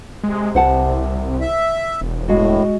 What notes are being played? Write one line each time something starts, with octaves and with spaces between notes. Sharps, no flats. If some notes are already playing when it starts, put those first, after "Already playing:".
C3 G#3
C2 C5 F#5 A5
E5
E1
A2 G#3 F#4